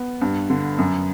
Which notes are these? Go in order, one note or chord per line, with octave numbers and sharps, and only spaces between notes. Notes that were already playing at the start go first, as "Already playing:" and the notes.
Already playing: B3
G2
D3
F#2